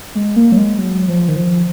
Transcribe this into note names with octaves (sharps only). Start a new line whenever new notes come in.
G#3
A#3
F#3
G#3
F#3
F3
D#3
F3